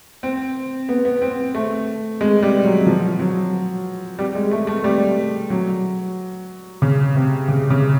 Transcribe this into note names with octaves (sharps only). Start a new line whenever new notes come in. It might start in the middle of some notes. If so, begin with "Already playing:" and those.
C4
B3
B3
C4
A3
G#3
G3
F#3
F#3
F3
F#3
G3
G#3
A3
A3
G3
F#3
C#3
C3
C#3
C#3